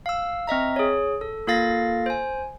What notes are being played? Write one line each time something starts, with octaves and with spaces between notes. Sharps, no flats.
F5 E6
C4 D#5 E5 A#5
G#4 C#5
A4
A#3 F4 A4 F5 A6 A#6
C5 G#5